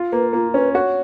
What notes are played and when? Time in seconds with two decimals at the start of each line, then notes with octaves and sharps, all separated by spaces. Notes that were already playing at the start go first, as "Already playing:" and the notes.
Already playing: F4
0.12 A#3 B4
0.33 A#3 F4
0.54 C#4 B4
0.74 F#4 C#5